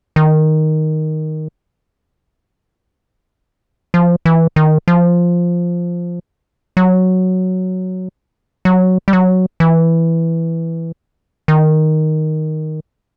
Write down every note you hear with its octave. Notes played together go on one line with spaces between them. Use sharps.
D#3
F3
E3
D#3
F3
F#3
F#3
G3
F#3
E3
D#3